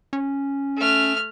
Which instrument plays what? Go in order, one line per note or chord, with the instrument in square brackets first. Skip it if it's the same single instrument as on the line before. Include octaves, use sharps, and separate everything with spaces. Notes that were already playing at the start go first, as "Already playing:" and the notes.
[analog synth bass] C#4
[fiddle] A3 F6